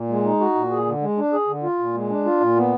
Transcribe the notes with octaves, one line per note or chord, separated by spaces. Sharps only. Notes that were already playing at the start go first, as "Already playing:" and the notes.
Already playing: A#2
G#3
D#4
F#4
A#2
G#4
D3
G#3
D4
G#4
D3
F4
A#2
G#3
D4
F4
A#2
B3